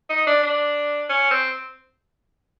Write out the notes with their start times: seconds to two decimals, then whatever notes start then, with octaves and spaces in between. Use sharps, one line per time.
0.10 D#4
0.27 D4
0.43 D4
1.09 C#4
1.31 C4